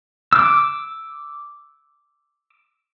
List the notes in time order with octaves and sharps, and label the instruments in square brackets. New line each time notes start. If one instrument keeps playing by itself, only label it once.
[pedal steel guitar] D6 E6